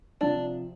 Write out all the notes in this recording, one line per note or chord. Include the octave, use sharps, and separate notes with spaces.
C3 F3 D4